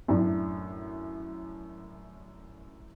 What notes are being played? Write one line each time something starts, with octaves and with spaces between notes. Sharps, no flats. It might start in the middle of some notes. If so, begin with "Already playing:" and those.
F#2 A2 D4